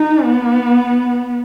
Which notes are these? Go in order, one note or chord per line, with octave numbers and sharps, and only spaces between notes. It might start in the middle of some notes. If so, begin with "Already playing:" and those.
Already playing: D#4
B3